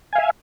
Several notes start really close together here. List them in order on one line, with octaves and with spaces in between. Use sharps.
G#5 F5 E5